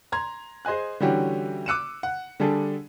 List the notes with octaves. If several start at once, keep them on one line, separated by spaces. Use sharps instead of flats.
A#5 C6 G#6
G#4 C5 D#5 G#5 F#6
D3 E3 G3 C#4 F#4 G4
D6 E6 F#6 C#7 D#7 E7
F#5
D3 G3 D4 G#4 A4